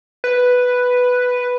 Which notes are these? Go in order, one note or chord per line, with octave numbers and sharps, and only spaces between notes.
B4